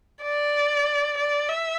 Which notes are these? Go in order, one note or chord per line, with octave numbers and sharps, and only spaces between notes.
D5
D5
E5